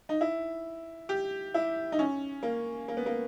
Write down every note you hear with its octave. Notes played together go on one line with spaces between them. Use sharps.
D#4
E4
G4
E4
D#4
C#4
A#3
A#3
B3
A#3